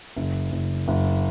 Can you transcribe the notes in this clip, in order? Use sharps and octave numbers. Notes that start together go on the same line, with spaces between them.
F#1
F#1
F#1